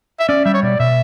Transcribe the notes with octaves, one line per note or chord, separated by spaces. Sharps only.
E5
C#4 D5
G3 E5
C#5
B2 D5
B2 E5